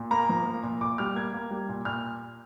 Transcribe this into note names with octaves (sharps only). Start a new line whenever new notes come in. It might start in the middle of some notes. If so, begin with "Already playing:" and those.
Already playing: A#2
A#3 A#5
F3
A#3
A#2
A#2 D6
G3 F6
A#3 G#6
A#3
G3
A#2
A#2 F6